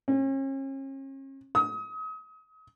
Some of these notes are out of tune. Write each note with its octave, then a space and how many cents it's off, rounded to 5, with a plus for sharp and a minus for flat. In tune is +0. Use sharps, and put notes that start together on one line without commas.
C#4 -40
D#6 +35